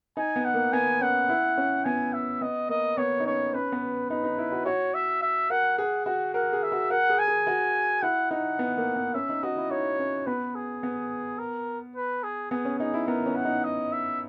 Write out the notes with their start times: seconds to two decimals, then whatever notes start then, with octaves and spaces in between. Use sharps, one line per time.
0.17 D#4 G#5
0.36 B3
0.45 F#5
0.54 A#3
0.73 B3 G#5
1.01 C#4 F#5
1.29 E4
1.58 C#4
1.85 B3 G#5
2.13 E5
2.41 B3 D#5
2.69 A#3 D#5
2.97 B3 C#5
3.20 D#4
3.26 C#4 C#5
3.54 C#4 B4
3.72 B3
4.10 D#4 B4
4.24 D#4
4.38 E4
4.52 F#4
4.65 F#4 C#5
4.94 E5
5.22 E5
5.50 A#4 F#5
5.78 G#4 F#5
6.06 F#4 F#5
6.34 A#4 F#5
6.53 G#4
6.63 E5
6.72 F#4
6.90 A#4 F#5
7.10 G#4
7.19 G#5
7.28 G#4
7.47 F#4
8.02 E4 F#5
8.31 D#4 F#5
8.59 B3
8.77 A#3
8.96 B3
9.14 C#4 E5
9.29 D#4
9.43 F#4 D#5
9.57 E4
9.70 D#4 C#5
9.99 C#4
10.26 B3 B4
10.55 G#4
10.83 B3
11.39 A#4
11.96 B4
12.24 G#4
12.51 B3 G#4
12.65 C#4
12.79 D#4 G#4
12.94 E4
13.08 B3 A#4
13.26 C#4
13.36 F#5
13.45 D#4
13.64 D#5
13.92 E5